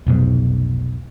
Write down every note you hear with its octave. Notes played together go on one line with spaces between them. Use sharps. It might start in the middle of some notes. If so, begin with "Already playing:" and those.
F1 B1 G#2